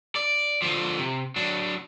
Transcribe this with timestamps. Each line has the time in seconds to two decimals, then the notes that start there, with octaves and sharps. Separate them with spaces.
0.16 D5
0.62 D3 F3
0.98 C3
1.36 F#3 D4